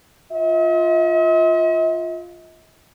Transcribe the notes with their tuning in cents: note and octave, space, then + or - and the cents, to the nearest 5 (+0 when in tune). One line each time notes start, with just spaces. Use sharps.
F4 +0 D#5 +45